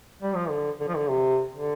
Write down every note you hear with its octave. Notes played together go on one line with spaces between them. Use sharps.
G3
F3
D3
D3
F3
D3
C3
D3